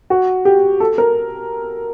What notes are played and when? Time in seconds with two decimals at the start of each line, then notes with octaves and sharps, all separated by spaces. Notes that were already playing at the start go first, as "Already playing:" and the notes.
0.10 F#4
0.45 G4
0.80 A4
0.98 A#4